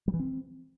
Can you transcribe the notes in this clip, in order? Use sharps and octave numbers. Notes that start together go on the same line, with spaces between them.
G3
E3
C4